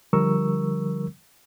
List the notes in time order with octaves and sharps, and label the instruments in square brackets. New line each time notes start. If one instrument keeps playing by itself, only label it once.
[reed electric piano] D3 F3 G3 A#4 C#6 E6